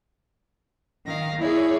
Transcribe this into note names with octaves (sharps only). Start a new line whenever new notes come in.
D#3 F5 A#6
E4 G#4 C#5 D5